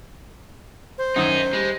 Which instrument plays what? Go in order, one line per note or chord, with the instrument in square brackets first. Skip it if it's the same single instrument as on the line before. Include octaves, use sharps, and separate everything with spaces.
[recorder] C5
[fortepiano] F#2 D#3 D#6 [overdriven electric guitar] D#4 G#4
[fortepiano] G3 [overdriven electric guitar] G#3